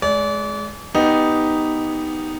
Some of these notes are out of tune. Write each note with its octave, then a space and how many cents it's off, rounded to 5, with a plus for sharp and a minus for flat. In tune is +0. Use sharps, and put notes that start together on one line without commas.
G#3 +25 D5 -35
B3 +0 D#4 +0 G4 +0